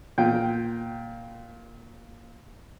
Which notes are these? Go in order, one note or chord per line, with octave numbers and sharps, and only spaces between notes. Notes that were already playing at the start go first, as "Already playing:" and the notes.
A#2 G5